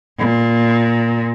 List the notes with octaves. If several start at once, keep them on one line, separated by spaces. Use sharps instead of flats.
A#2